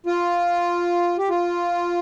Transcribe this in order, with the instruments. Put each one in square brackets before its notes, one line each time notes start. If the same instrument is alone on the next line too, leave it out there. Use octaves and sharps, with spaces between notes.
[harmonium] F4
G4
F4